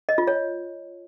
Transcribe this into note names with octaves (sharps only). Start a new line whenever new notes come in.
D#5
F4
C#5